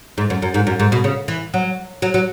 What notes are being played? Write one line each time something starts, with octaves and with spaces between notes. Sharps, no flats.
G#2
F#2
F#2
G#2
F#2
G#2
B2
C#3
E3
F#3
F#3
F#3